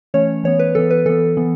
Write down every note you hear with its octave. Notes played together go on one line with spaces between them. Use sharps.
E3 A3 C#4 C#5
E3 B3 C#5
B4
E3 B3 A4
B4
E3 B3 A4
E3 B3